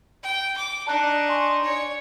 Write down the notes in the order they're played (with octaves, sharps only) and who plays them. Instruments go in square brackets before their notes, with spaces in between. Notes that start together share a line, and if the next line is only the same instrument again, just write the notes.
[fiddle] G5
D6
[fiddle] D4 D#4 [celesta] A5 A#5 F#6
[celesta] G#5 C6 C#6
[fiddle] C#5 [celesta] D5